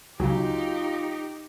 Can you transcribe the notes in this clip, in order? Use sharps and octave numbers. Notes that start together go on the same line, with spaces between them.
C#2 C#3 F#3 D#4 F4 G4